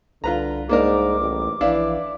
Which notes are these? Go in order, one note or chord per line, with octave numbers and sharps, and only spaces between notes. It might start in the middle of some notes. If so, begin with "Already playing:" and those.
C2 D3 F4 B4 A#5
G#2 A#3 D4 A#4 D6
A1
A#1 E3 D4 E4 F5